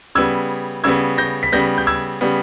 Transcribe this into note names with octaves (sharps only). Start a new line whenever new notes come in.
C#3 G3 B3 E6 G#6
C#3 G3 B3 E6 G#6
G6 A#6
B6
C#3 G3 B3 G6 A#6
G6
E6 G#6
C#3 G3 B3